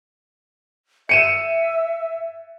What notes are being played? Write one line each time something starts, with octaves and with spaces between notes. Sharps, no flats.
E5 C#7 D#7 E7